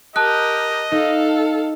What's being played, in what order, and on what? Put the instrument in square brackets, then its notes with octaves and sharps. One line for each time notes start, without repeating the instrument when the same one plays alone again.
[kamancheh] G4 A#4 [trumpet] D#5 [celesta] A5 D#6 F#6
[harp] D#4 [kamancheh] A4 F5